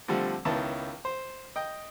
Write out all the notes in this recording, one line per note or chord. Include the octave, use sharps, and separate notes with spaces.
D3 F3 G3 A3 C4
C#2 D#3 B3 E4 A5
C5
D#5 G5